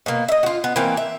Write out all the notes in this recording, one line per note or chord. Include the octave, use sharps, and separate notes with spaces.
B2 A#3
D#5 E5
F4 F#4
B3
E3 A#3 C4 F5
E5